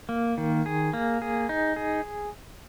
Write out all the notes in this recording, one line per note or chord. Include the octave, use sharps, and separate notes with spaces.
A#3
D#3
G#4
A#3
G#4
D#4
G#4